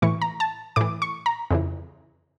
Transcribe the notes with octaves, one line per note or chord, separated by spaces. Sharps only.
A2 E3 C#6
A#5
A5
A2 E3 D6
C#6
A#5
F2 C#3 E3